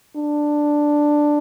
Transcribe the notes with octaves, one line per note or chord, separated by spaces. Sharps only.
D4